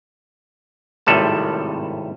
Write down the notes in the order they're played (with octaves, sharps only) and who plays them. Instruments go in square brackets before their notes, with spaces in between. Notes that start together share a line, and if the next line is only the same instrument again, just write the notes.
[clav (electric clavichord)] G#1 A2 C3 G3 A4 A5